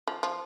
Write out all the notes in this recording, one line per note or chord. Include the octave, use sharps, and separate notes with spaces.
F3
F3